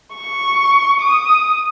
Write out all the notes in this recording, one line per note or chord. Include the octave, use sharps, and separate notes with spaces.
C#6
D#6